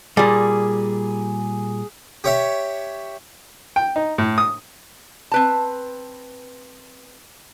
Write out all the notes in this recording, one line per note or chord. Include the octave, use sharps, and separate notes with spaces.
A#2 G3 G#4
G4 C#5 E5
G5
D#4
A2
D#6
C4 B4 A5